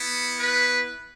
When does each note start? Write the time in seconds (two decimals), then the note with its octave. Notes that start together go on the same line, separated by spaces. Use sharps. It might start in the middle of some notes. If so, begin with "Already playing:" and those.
Already playing: B3 E4
0.37 B4